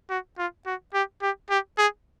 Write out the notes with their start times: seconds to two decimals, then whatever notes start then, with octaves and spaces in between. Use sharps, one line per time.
0.10 F#4
0.38 F4
0.66 F#4
0.94 G4
1.22 G4
1.50 G4
1.78 G#4